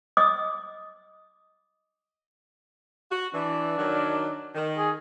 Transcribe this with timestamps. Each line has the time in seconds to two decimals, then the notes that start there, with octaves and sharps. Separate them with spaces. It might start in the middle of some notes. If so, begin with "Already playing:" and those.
0.17 D#5 D6 D#6
3.11 F#4
3.34 E3 D4
3.78 D#3 F#3
4.55 D#3
4.78 G#4